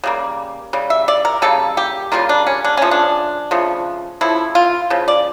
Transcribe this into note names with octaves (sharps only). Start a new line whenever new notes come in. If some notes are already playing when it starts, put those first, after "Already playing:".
C#3 G3 A#3
C#3 G3
E5
D5
A#4
C#3 G3 A#3 A4
G4
C#3 G3 A#3 F4
D4
C#4
D4
C#3 F3 A3 C#4
D4
C#3 F3 A3
C#3 F3 A3 E4
F4
C#3 F3
D5